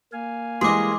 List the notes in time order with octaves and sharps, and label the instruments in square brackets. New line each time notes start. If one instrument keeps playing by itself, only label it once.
[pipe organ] A#3 F5 G#5
[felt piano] E3 G3 G#3 [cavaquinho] G#4 D#5 [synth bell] C6 D6